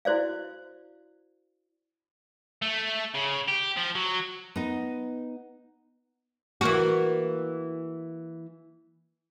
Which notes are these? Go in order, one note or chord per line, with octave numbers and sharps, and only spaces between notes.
E4 F#4 C5 D5 F5
A3
C#3
G4
F3
F#3
B3 D#4
E3 A#3 F#4